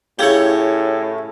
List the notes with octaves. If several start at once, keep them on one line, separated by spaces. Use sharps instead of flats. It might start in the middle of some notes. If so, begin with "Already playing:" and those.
A2 C#3 E4 G4 G#4 C#5 F5